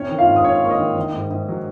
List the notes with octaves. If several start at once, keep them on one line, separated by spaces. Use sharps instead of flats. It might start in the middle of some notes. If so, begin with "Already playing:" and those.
Already playing: C3 C#4 C#5
D#3
F4 F5
G#2
D#6
C#4 C#5 C#6
A#3 C#6
D#5 D#6
D#3
D#3
G#2
G#2
F#3